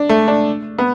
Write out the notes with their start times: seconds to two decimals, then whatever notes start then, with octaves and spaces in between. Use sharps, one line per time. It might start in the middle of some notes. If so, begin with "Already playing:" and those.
Already playing: D4
0.09 A3
0.28 D4
0.79 B3